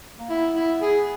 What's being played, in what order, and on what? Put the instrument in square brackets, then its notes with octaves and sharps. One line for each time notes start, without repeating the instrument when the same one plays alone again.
[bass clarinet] A#3
[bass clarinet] B3 [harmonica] E4
[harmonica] E4
G#4